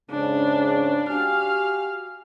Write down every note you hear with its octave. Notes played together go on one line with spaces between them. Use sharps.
F2 G#2 C#3 D4
F#4 G4 F5 G#5